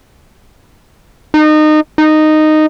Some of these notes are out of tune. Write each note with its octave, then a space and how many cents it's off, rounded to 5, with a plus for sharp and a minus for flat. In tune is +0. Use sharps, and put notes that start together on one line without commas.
D#4 -25
D#4 -10